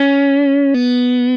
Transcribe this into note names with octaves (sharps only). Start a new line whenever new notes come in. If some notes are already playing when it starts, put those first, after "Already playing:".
Already playing: C#4
B3